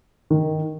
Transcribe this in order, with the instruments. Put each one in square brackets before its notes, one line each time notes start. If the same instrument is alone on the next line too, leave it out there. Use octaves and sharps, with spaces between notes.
[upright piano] D#3